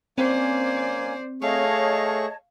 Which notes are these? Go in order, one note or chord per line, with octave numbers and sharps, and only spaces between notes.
A#3 C4 C#4 C5 D5 G#5
A3 G#4 C#5 D#5 F5 A5 C#6